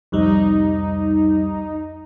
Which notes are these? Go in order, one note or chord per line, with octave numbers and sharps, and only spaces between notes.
C2 F2 G3 D#4